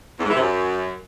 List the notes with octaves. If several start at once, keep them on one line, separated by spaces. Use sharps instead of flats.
E2
G#2
E3
C3
F#2